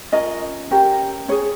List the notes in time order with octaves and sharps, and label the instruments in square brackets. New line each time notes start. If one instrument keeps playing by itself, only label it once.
[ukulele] C#4 F4 A#4 D#5
C#4 G4 A#4
C#4 G#4 C#5